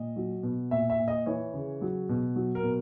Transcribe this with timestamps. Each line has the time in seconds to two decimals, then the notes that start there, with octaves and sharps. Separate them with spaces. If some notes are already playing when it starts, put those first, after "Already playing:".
Already playing: A#2 D#5
0.16 F#3
0.43 B2
0.71 A#2 E5
0.90 E5
0.99 A#2
1.08 D#5
1.26 E3 C#5
1.54 C#3
1.81 F#3
2.09 B2
2.36 F#3
2.55 A#4
2.63 B2